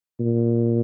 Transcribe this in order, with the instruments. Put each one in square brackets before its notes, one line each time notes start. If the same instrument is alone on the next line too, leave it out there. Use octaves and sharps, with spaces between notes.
[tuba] A#2